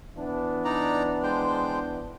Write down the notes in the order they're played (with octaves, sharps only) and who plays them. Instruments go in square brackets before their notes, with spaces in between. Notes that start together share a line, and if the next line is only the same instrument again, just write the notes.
[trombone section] E3 B3 D4
[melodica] D#4 D5 A#5
G#3 C5 G5